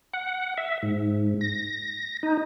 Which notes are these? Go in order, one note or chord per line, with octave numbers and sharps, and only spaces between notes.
F#5
E5
G#2
A#6
D#4